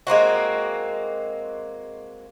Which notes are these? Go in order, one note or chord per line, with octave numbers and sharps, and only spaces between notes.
G#3 A#3 C4 F#4